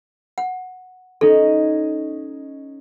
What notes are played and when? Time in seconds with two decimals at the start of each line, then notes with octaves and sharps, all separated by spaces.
0.38 F#5
1.21 C#4 D#4 A4